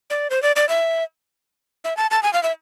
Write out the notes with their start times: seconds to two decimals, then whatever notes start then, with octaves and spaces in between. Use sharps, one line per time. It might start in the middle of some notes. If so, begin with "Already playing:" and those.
0.10 D5
0.30 C5
0.42 D5
0.56 D5
0.69 E5
1.84 E5
1.97 A5
2.11 A5
2.23 G#5
2.33 F5
2.43 E5